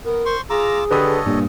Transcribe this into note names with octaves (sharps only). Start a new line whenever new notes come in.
B3 A#4
C5 C6 C#6
F4 G#4 A#5 D6 E6
D3 G4 A4 B4 C#5 D#5 D#6
G2 A#2